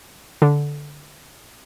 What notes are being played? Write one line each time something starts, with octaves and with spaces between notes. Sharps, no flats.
D3